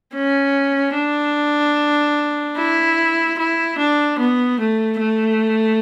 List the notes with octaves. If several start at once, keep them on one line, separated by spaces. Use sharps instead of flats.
C#4
D4
E4
E4
D4
B3
A3
A3